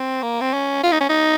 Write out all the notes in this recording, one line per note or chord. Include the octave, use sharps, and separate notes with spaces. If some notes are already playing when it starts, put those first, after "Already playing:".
Already playing: C4
A#3
C4
C#4
F4
D#4
C#4
D#4